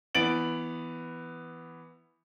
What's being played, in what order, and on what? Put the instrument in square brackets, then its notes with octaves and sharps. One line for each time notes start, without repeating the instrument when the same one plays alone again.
[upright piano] E3 B3 A6 D7 F#7